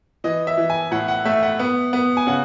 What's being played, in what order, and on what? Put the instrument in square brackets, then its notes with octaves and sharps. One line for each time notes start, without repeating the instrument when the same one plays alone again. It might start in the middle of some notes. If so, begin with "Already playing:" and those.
[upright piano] E3 D#5
E5
E3
G#5
A2 F#5
F#5
A3 E5
F#5
B3
B3
G#5
C#3 F#5